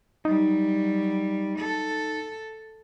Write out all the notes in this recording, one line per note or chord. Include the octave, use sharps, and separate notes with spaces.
F#3 G3 D#4
A4